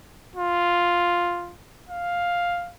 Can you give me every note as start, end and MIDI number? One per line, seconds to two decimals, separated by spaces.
0.36 1.55 65
1.89 2.72 77